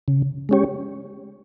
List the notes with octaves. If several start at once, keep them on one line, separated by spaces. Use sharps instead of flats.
C#3
G#3 C#4 G4 C#5